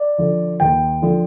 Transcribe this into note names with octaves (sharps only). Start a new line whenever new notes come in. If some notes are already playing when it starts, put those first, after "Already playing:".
Already playing: D5
D3 F3
D#2 G5
D3 F3